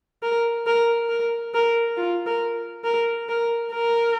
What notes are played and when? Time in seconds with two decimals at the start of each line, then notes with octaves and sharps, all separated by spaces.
0.23 A#4
0.67 A#4
1.09 A#4
1.54 A#4
1.97 F4
2.26 A#4
2.84 A#4
3.29 A#4
3.72 A#4